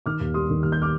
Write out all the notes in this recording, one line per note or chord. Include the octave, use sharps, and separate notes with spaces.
D#3 D6 F6
D#2
G3 C6 D#6
D#3
D#2 F6
G6
D6 F6